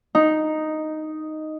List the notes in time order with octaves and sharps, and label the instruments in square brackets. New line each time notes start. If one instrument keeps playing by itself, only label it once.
[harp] D#4